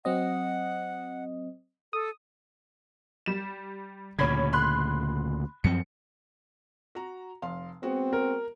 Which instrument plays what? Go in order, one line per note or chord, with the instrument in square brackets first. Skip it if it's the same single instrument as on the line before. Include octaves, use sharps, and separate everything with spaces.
[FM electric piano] F#3 C4 D#5 [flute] F#5
[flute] A4 [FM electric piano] D#6
[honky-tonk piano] G3 E7
[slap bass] D2 A#2 C#3 [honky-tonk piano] C#4 B5 G#6
[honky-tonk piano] B5 C6 F#6
[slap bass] F#2 F3 C4 [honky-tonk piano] C#7
[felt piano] F#4 A#5
F1 F5 C6
[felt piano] G#3 B3 F#4 [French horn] C4
[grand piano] A#4